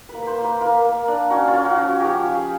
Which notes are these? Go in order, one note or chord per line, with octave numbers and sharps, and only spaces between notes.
B4
A#3
B4 C5
A#3
B4
A#3 A#4
A#3
D4
C#4 F#4
F4
C#4
F#4
F3
F#4
F3 G4
F3
G#4